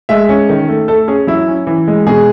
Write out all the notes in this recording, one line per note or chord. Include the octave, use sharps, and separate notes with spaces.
G#3 E5
C#4
D#3
A3
A3 A4
C#4 G#4
F#3 E4
C#4
E3
G#3
B2 G#4